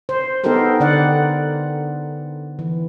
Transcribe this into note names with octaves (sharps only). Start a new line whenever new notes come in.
C5
B3 D#4 G4 A4 A#4 C5
D3 D5 F#5
E3